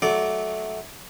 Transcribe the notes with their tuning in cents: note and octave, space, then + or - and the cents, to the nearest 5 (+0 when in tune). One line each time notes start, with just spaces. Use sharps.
F#3 +0 A3 -20 D5 -20